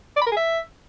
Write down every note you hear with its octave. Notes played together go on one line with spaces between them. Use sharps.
D5
B5
A#4
G#4
E5